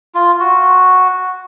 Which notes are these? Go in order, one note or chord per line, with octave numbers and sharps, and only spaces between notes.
F4
F#4